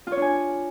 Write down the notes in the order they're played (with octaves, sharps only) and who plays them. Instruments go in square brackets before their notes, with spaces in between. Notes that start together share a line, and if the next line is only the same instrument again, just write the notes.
[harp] F4
C#5
D4
G#5